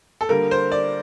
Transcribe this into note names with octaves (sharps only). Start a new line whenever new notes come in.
A4
D3 G3 A#3 A#4
C5
D5